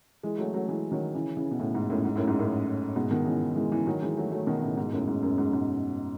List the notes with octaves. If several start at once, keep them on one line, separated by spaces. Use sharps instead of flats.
E3 G#3
F#3 A3
F#3 A3
E3 G#3
D#3 F#3
C#3 E3
C#3 E3
B2
A2 C#3
G#2
F#2 A2
G#2
F#2 A2
G#2
F#2 A2
G#2 B2
B2 D#3
C#3 E3
E3 G#3
C#3 E3
D#3 F#3
E3 G#3
F#3 A3
F#3 A3
B2 D#3
A2 C#3
G#2 B2
F#2 A2
G#2
F#2
G#2
G#2 B2